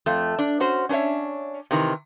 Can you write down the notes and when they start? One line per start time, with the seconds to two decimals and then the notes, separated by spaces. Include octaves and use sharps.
0.06 F2 A3
0.39 D4
0.60 C#4 F#4 C5
0.89 C#4 D4 C5 C#5 E5
1.71 C3 D#3 E3